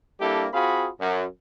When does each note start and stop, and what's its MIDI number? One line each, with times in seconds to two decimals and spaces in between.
0.20 0.47 55
0.20 0.47 58
0.20 0.47 62
0.20 0.47 64
0.20 0.47 67
0.20 0.47 69
0.53 0.89 60
0.53 0.89 65
0.53 0.89 66
0.53 0.89 68
0.53 0.89 77
0.53 0.89 83
1.01 1.25 42